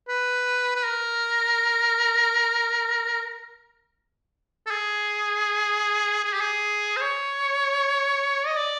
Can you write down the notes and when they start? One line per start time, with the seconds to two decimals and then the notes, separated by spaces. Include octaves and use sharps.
0.08 B4
0.76 B4
0.85 A#4
4.67 A4
4.71 G#4
6.25 G#4
6.33 G4
6.41 G#4
6.97 C5
7.02 C#5
8.47 D#5
8.57 D5